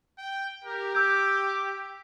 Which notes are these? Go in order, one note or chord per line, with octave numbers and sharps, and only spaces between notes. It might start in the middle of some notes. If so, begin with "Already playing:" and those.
G5
G4 A#4
D6 E6 G6